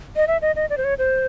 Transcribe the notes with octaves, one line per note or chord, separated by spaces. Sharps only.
D#5
E5
D#5
D#5
D5
C5
C#5
C5